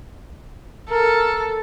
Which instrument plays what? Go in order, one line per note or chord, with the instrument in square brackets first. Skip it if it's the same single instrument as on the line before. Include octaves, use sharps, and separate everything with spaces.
[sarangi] A4 [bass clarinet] A#4